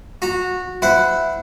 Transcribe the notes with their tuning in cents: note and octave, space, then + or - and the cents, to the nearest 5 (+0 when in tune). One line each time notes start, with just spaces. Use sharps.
F#4 -20 A#5 -25
E4 +0 C5 -40 F#5 +0